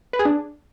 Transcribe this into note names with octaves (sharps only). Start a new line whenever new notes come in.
B4
G#4
D4